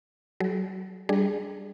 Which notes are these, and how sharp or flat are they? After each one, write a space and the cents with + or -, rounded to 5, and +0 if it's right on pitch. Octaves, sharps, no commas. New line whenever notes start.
F#3 +20 G#4 +45
G3 +0 D4 +0 G#4 +0